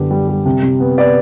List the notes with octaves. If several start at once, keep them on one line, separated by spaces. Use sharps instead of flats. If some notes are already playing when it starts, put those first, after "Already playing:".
Already playing: F#2 D3 G3 B3 G4
G3
G3
C3
C3
B3
B3 B4 D5